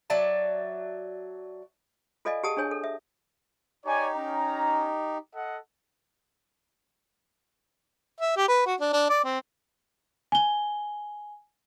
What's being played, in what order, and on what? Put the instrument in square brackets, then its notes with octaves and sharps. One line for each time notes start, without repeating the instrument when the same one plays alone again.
[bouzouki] F#3 D5 E5 A5
[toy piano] F4 A4 D5 D#5 F5 G#5
G4 G#4 F#5 A5 D#6
D4 G#4 C#5 G#5
A4
E5
[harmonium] D#4 G4 [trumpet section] C#5 D5 G#5
[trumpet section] C#4 A#5
A4 D#5 F#5
[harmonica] E5
G4
B4
F#4
D4
D4
D5
C4
[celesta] G#5 G7